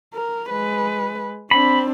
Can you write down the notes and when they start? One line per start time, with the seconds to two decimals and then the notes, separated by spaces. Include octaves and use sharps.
0.14 A#4
0.49 G#3 B4
1.51 C4 D4 B5